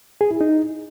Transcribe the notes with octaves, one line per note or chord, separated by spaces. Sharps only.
G#4
E4
D#4